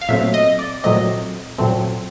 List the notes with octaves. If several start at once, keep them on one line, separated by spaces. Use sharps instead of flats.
F5
A#2 F#3 A3 C4 E5
D#5
D5
A#2 F#3 A3 C4 D#5
A#2 F#3 A3 C4